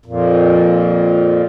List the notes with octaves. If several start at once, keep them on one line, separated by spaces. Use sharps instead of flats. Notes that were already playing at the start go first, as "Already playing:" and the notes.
F2 A#2